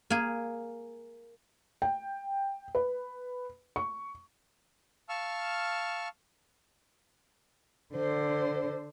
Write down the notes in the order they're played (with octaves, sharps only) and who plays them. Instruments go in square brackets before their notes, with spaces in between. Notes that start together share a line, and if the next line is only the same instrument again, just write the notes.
[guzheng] A#3 G#4
[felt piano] G5
B4
C#6
[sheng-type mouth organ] F5 A5 C#6 E6 F6
[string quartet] D3 C5